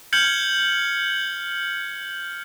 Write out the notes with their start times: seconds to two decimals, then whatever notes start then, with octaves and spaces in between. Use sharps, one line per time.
0.13 F6 G6 G#6 C#7 F#7 G7